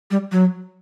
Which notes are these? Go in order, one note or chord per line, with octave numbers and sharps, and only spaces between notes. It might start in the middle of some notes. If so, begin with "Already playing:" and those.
G3
F#3